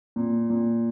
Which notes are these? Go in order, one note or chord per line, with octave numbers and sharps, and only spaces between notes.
A#2
A#2